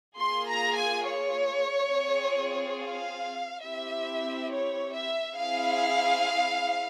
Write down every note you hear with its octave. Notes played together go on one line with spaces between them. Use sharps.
A#3 F4 G#4 C6
A#5
G#5
C#5
C4 F4 G#4
F5
C4 E4 G4 E5
C#5
E5
C4 E4 G#4 F5